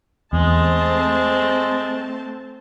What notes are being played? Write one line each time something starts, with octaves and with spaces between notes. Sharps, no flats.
E2 G#3 A3 C4 A5